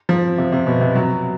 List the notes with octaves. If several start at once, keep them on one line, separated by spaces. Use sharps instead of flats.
F3
C3
C3
B2
C3
F#3